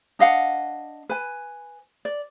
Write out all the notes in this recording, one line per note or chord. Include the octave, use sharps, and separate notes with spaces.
D4 D#5 F5 F#5
B4 G#5
D5